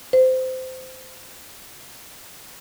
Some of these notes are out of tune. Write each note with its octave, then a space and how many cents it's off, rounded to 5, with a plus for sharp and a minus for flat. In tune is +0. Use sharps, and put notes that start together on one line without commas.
C5 -20